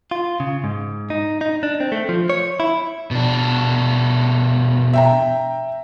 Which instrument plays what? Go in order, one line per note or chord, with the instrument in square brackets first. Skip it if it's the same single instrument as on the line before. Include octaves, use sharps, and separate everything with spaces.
[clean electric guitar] F4
C#3
G#2
D#4
D#4
D4
C4
A3
F3
C#5
E4
[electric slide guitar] B2 D4
[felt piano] E5 G5 A#5